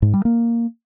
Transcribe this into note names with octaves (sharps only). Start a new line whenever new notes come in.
G#2
G3
A#3